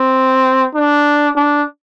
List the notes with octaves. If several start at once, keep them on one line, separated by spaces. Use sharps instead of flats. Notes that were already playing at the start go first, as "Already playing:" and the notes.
Already playing: C4
D4
D4